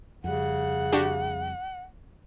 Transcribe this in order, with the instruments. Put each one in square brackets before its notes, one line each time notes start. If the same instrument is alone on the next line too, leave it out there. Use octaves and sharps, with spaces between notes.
[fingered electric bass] F2 G3 [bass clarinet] C#3 [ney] F#5
[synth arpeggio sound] D4 F#4 G4